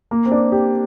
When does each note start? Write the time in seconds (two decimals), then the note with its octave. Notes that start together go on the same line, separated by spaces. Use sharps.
0.11 A#3
0.26 C4
0.32 D4
0.52 G4